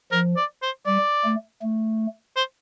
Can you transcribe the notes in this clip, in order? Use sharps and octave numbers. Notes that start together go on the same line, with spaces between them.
F3 A#4
D5
C5
G3 D5
A3
A3
C5